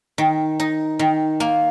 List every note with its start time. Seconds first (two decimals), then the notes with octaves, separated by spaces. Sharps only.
0.18 D#3
0.60 D#4
0.99 D#3
1.40 A#3